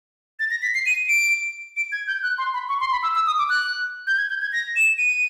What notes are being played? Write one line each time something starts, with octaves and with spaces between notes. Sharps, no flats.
A6
A#6
B6
C7
D#7
D7
D7
G#6
G6
F#6
C6
B5
C#6
C6
B5
E6
E6
D#6
D6
F#6
G6
G#6
G6
G#6
A#6
E7
D#7